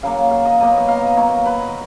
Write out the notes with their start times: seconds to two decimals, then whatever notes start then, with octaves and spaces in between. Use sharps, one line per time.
0.03 C#3 F#3 A#3 F5
0.31 F5
0.45 D#5
0.60 B2 F#3 A#3 D#5
0.77 D#5
0.88 F5
1.02 D#5
1.17 D#3 F#3 A#3 C#5
1.46 B4